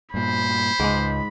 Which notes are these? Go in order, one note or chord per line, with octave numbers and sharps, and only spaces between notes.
G2 A#2 C5 B5
C#2 G#2 G#3